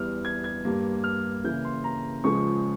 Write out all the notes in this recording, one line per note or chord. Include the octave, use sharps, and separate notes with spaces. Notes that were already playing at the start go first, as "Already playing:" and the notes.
Already playing: E2 E3 G3 F6
G#6
G#6
G2 G3 A#3
F6
C#3 E3 A#3 G6
C6
A#5
C#2 C#3 F3 G#3 C#6